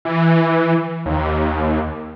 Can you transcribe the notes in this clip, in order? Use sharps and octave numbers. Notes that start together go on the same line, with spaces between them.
E3
D#2